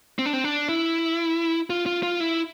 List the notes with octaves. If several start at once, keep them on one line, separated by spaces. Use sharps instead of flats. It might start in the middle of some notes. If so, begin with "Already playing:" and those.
C4
D4
C4
D4
E4
F4
F4
F4
E4